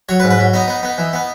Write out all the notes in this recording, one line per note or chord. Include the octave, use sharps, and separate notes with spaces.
F#3 C#5
B4
G#2
B4
F#3
B3 D#4
B3
B3
E3
B3